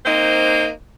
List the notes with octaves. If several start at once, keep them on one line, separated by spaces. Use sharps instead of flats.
A#3 C4 D#4 C5